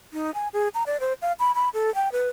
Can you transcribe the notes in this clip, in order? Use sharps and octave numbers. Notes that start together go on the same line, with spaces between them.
D#4
G#5
G#4
A#5
D5
C5
F5
B5
B5
A4
G5
B4